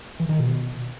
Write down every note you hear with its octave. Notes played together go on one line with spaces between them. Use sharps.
E3
D#3
B2